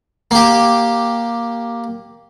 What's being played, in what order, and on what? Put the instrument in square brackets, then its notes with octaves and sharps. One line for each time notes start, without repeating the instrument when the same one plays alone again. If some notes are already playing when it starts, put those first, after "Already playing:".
[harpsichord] A#3 G4